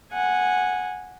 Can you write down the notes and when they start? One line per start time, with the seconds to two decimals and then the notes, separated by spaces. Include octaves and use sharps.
0.12 F#5 G#5